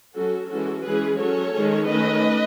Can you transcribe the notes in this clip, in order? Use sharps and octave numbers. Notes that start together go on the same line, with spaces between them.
F#3 C#4 F#4 A4
E3 G#3 C#4 F#4 A4
E3 G#3 C#4 G#4 B4
F#3 C#4 A4 C#5
D#3 G#3 C#4
D#3 A3 C#4 B4 D#5